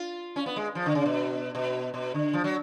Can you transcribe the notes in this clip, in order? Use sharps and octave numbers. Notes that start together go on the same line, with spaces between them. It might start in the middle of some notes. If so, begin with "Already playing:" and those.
Already playing: F4
C#4
B3
G#3
F3
D3
C#3
B2
B2
B2
D3
F3
F#3